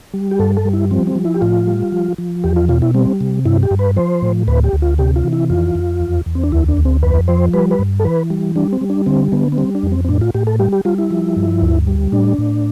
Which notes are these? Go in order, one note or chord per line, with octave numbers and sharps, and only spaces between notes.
G3
G4
G2 A4
A4
G3
E4
F3 C4
C4
F3
E4
G4
A2 F4
G3
F3
F3
E2 G4
F4
B2 F4
E4
G3 C4
C3
G2 E4
G4
G2
B4
F3 C5
A2
D2 B4
G4
D2
F4
C3 G4
F4
E3
E4
F2 F4
F2
E2
E2
C4
D4
D2 E4
D4
D2
C4
F2 B4
F3 C5
G3 B4
B4
G2
A4
E3 B4
G3
G3 D4
C4
G3
D4
D3 C4
D3 B3
B3
G3 C4
D4
F2
C4
C4
A2 D4
F4
A2 G4
A4
G3 G4
G4
G3 F4
E4
F3
G2
D2
G3
A2 D4
A2